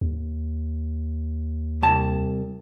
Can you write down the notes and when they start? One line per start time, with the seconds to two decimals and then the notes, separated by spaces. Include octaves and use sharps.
0.01 D#2
1.83 C2 A5